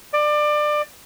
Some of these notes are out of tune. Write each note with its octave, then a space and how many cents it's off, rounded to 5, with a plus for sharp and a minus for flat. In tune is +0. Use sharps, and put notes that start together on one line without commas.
D5 +25